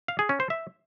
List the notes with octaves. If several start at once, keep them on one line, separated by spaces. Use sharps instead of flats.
F5
G#4
C#4
C5
E5